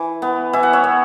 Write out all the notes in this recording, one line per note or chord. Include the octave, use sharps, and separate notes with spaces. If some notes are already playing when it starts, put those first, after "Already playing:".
Already playing: E3
B3
E3 E5
F#5
C#5 E5
B3